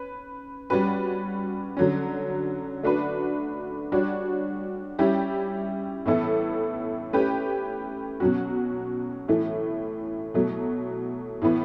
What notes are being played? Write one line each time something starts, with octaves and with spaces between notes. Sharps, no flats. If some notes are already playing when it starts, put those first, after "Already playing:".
Already playing: C#4 B4
G3 C#4 F#4 B4
D3 F#3 C#4
A3 D4 F#4 B4
G3 D4 F#4 C#5
G3 C#4 E4 G4
A2 E3 B3 E4 A4
A3 C#4 G4 B4
B2 F#3 C#4 F#4
A2 E3 A3
B2 F#3 A3
A2 E3 B3